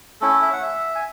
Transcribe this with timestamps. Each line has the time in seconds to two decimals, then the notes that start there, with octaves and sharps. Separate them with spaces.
0.21 A3 C#4 E4 A4
0.42 E5
0.53 F#5
0.63 E5
0.95 G#5